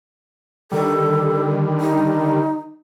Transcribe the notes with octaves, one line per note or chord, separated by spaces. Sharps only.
D3 D#3 G3 A4
D#4